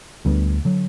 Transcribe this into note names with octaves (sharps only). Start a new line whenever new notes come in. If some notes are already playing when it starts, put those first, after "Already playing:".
D2 D3 G3 B3
D3 F#3